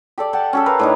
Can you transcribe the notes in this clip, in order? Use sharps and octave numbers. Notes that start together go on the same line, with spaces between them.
G4 A4 D5
F#5 G5 A5
C#4 G4 A4
A#4 B4 F5
A2 D4 D#4